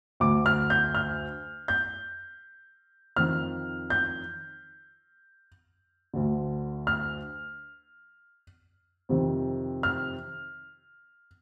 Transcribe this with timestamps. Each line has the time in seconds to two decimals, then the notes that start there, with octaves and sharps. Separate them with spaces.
0.20 D2 D3 D6
0.46 F6
0.70 G6
0.95 F6
1.68 G6
3.16 F2 D#3 F6
3.90 G6
6.14 D2 D3
6.87 F6
9.09 F2 C3 D#3
9.83 F6